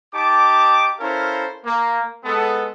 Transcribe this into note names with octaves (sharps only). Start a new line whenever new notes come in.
D#4 G4 A5 D6
C#4 E4 A4 A#4 C5 F5
A#3
G#3 B3 A4